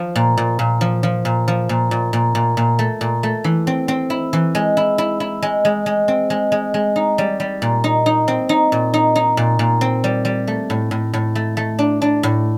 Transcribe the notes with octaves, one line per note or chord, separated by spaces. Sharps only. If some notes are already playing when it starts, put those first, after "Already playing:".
Already playing: F3
A#2
A#2
A#2
F3
F3
A#2
F3
A#2
A#2
A#2
A#2
A#2
A3
A#2
A3
E3
C4
C4
E4
E3
G#3
E4
E4
E4
G#3
G#3
G#3
C4
G#3
G#3
G#3
D#4
G3
G3
A#2
D#4
D#4
C4
D#4
A#2
D#4
D#4
A#2
A#2
C4
G3
G3
A3
A2
A2
A2
A3
A3
D4
D4
A2